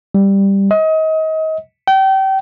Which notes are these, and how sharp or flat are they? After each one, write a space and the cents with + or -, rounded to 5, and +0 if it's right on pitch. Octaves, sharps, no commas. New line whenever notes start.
G3 +5
D#5 +30
G5 -30